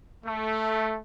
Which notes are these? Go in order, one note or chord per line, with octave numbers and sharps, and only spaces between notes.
A3